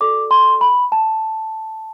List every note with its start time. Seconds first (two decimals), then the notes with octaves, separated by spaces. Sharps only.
0.01 F#4 A4 D5 D6
0.31 C6
0.61 B5
0.92 A5